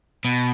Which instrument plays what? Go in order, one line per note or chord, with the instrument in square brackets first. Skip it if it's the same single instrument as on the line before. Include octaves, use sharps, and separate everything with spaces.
[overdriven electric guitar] B2